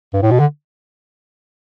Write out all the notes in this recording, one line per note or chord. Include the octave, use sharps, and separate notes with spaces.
G2
A2
B2
D3